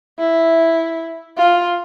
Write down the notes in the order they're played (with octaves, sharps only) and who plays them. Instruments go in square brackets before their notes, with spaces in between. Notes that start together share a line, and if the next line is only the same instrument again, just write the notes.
[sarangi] E4
F4